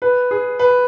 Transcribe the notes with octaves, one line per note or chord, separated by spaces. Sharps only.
B4
G#4
B4